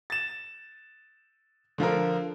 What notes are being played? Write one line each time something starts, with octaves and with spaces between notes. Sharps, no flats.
A6 E7
D3 F3 F4 A#4